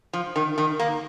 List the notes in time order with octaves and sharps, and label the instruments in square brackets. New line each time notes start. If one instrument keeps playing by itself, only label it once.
[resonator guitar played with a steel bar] F3
D#3
D#3
A#3